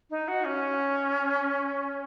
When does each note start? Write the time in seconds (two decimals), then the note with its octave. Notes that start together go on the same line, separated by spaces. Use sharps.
0.10 D#4
0.28 F#4
0.45 C#4